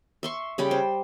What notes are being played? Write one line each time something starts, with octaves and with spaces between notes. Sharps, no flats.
E5 C6 C#6
C#3 G3 G5 B5
C5